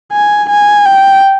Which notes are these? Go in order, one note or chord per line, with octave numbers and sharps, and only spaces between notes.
G#5
G#5
G5